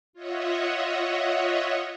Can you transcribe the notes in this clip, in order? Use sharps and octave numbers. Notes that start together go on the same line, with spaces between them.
F4 C#5 D#5 E5 F#5